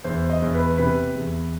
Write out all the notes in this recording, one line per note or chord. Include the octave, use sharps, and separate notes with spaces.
E2 C5
D#5
E2
B4
C3 B4
E2